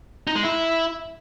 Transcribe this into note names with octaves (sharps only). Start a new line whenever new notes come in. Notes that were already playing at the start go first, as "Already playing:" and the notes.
D#4
G#3
E4